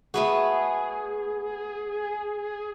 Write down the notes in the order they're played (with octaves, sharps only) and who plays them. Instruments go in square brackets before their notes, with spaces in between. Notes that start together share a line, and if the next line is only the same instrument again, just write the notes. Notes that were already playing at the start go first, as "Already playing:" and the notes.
[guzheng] A3 B3 F#4 [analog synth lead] G#4